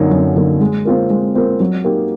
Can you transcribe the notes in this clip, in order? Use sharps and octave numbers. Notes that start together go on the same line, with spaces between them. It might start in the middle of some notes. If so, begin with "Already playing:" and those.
Already playing: F#2 D3 F#3 A#3 D#4
F#2
D3 F#3 A#3 D#4
G#3
C4 F4 A#4
G#3
C4 F4 A#4
F#3
A#3 D#4 G4